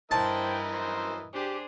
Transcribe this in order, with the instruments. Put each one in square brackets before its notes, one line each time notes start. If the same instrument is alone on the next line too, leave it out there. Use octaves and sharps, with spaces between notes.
[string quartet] G2 E4 [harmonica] E3 A#4 D#5 [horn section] C5 G5 [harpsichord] A5
[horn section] F#2 C5
[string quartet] D4 G#4 C5 [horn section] G4